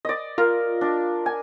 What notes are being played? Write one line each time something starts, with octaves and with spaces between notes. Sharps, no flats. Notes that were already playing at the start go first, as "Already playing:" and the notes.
D5 D#5
F4 A#4
D4
G#5